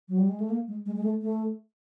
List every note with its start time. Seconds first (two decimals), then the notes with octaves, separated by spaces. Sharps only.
0.09 F#3
0.18 G3
0.29 G#3
0.40 A3
0.50 A#3
0.68 G#3
0.86 G#3
0.96 G#3
1.04 A3
1.22 A3